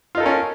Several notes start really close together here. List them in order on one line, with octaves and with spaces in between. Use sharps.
F4 D#4 A4 A#4 C#4